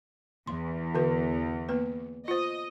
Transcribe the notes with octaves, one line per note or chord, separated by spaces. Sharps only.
E2 C6
D3 F#4 B4
A#3 B3 B4
F4 C5 D#5